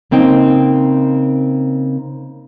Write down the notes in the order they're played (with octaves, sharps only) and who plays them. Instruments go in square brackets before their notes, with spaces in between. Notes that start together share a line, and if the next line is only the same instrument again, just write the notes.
[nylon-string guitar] C#3 A#3 C4 D#4 G5